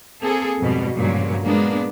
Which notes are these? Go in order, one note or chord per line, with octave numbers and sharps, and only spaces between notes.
A#3 C4 G#4 A4
F2 G#2 B2 G3
G2 A#2 C#3 F3 F#3 G#3
G#3 A#3 B3 D4